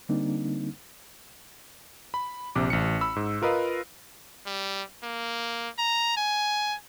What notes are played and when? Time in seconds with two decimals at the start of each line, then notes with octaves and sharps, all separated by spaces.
0.09 D3 G3 A#3 C4 D4 D#4
2.14 B5
2.55 A#1 C3 D6
2.70 A1 C#7
3.01 B5 E6
3.16 G#2
3.42 F4 A#4 B4 D#5 F5
4.46 G3
5.03 A#3
5.79 A#5
6.17 G#5